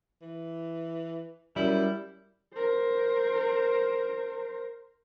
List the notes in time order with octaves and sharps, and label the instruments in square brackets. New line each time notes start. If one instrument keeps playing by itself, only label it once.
[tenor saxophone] E3
[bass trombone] F#2 [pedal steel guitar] G3 [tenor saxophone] E4
[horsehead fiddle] A#4 C5